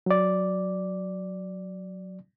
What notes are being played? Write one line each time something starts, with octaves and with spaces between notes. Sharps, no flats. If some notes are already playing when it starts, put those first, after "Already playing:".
F#3 D5